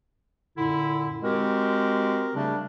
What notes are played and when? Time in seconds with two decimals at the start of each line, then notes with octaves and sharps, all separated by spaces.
0.56 F#2 A#2 D3 E4
1.22 G#3 C4 F#4 G4 A#4
2.35 C#3 G3 A3 D4